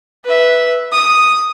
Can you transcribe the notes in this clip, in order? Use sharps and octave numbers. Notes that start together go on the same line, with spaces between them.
B4 E5
D#6